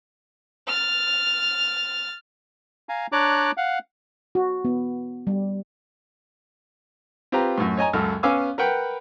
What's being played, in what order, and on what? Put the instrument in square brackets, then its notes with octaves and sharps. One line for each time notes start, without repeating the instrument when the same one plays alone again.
[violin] F6 A6
[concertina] F5 G#5 A#5
D4 C#5 D5 A#5 D6 F#6
F5 F#5
[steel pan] F#4
B3
G3
[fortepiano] C4 F4 G4 B4 A#5
F#2 A2
C#5 D#5 G#5 A#5
C#2 F#2 A4 F6
B3 C#4 F5 G#5 D6 E6
A#4 B4 F#5 G5 B5